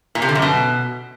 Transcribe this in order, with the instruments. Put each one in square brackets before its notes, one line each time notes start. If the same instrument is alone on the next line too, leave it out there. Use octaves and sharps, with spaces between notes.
[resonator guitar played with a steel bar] A#2
C3
D3
F#2
B2